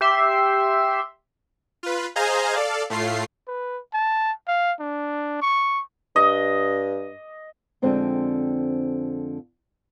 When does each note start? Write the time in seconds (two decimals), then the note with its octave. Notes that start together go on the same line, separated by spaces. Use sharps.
0.01 G4 E5 C6
1.83 F4 B4
2.16 G#4 C5 D#5 F5 G#5 A#5
2.55 A4 D5 F5
2.90 A2 A3 F4 C7
3.48 B4
3.93 A5
4.48 F5
4.80 D4
5.42 C#6
6.16 G2 D#5
7.82 F2 D3 G#3 C4 C5 D5